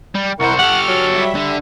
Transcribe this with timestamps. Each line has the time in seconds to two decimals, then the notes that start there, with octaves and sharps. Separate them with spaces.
0.15 G3
0.40 C2 E4 A#4 C5 F#5 C#6
0.59 G4 A4 F#5 F6
0.88 F#3
1.14 G3 E5
1.35 D3